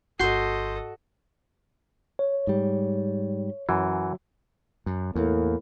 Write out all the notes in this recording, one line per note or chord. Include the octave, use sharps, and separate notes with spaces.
G1 F#4 A4 D#5 C6 G6 C7
C#5
G#2 G3
F#2 E3 F#3
F#2
E2 A2 A#3